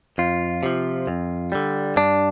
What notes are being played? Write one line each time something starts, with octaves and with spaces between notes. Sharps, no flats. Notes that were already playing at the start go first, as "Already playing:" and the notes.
F2 F4
C3 F3
F2
D3 G3
G2 D4